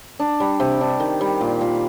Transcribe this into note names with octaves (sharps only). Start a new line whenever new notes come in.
D4
G3
C3
D4
D#3
G3
A#2
A#2